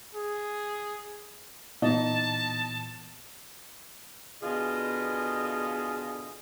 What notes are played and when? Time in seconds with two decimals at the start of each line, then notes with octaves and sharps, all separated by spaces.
0.15 G#4
1.82 A#2 E3 B3 D#4 A5
4.43 B2 D3 F4 G#4 D#5 G#5